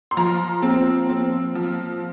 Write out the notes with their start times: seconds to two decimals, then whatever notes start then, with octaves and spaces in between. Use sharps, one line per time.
0.11 C6
0.17 F3 A#5
0.63 C4
1.09 C4
1.55 F3